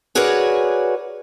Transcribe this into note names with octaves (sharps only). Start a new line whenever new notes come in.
F#4 G#4 A#4 B4 C#5 D5